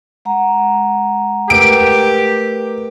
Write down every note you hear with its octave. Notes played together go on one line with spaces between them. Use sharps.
G#3 F#5 A#5
A3 G4 A#4 B4 D7